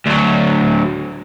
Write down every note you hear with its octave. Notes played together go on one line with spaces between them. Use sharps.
D2 F#3